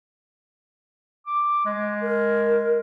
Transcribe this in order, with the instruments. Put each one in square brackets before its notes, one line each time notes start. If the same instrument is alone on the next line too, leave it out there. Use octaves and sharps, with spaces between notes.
[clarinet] D6
G#3
[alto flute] A#4